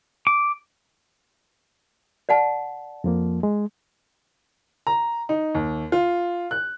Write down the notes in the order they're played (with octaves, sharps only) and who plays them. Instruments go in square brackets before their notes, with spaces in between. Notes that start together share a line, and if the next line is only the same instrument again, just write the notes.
[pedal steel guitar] D6
[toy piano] D5 F#5 A5
[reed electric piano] F2 F3 A#3
G#3
[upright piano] A#5
D#4
D#2
F4
F#6